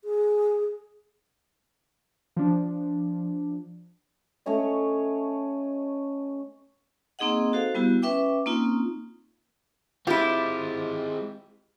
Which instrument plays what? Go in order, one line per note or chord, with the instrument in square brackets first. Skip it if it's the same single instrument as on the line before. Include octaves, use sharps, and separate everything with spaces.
[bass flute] G#4
[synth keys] F3 D4
[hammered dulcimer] A3 C#4 C#5 D#5
[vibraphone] A#3 C4 D#4 G#4 D#5 F#5
F#4 A4 C5 F5
G3 B3 E4 F#4 G4
C#4 B4 E5 G5 D6
A#3 C4 C#4 D#4 F4
[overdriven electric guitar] G#3 C4 [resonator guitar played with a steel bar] E4 G4 [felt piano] F4